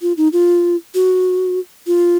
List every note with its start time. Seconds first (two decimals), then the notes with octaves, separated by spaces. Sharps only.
0.02 F4
0.17 D#4
0.33 F4
0.95 F#4
1.87 F4